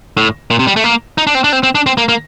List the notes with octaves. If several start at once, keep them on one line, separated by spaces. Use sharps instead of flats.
A2
A#2
C3
G3
A3
A#3
D#4
D4
C4
D4
C4
C4
D4
C4
A#3
A#3